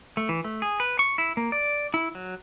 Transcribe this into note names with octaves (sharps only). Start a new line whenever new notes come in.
A3
E3
A3
G#4
B4
C#6
E4
A#3
D5
E4
F#3